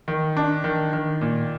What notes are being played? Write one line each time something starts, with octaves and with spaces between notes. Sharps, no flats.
D#3
D4
D#3
D#3
A#2